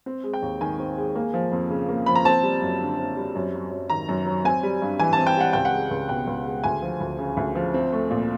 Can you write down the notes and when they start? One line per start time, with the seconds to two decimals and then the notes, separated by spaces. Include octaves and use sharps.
0.06 C4
0.24 G#3
0.33 G5
0.42 D#2
0.61 D#3 G#5
0.79 C4
0.98 G#3
1.15 A#3
1.34 F3
1.52 F2
1.70 C#3
1.89 A#3
2.06 F3 B5
2.15 A#5
2.25 C4 A5
2.43 G3
2.62 F#2
2.80 D3
2.98 C4
3.17 G3
3.35 F#2
3.54 F#3
3.71 F#2
3.90 D#3 A#5
4.09 F#2
4.26 F#3
4.44 C4 G#5
4.63 G3
4.82 G2
4.99 E3 G#5
5.13 A5
5.17 C4
5.27 G5
5.37 G3 F#5
5.53 C#2 G5
5.65 F#5
5.73 G#3
5.91 C#2
6.09 B2 G5
6.27 C#2
6.45 G#3
6.64 D2 G#5
6.82 F3
7.00 D2
7.19 C#3
7.37 D2
7.55 F3
7.74 C4
7.93 A3
8.10 A#2